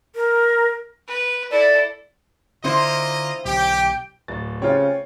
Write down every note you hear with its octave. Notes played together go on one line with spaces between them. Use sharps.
A#4
B4
E4 A4 D5
D3 A#3 C4 E4 F4 C5 D#5
B1 D3 G4 G5
D1 A6
C#3 C4 F4 G4 C#5